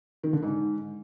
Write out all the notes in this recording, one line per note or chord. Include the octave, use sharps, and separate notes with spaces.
D#3
D3
G#2